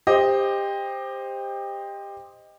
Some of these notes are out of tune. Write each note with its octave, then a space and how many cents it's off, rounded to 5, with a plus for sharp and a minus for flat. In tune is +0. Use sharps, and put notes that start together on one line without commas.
G4 +20 C5 +0 D#5 +0